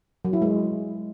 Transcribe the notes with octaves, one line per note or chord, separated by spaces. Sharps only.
F#3
E4
G#3